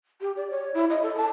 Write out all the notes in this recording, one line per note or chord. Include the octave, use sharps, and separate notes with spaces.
G4
D5
C#5
E4
D#5
A4
A5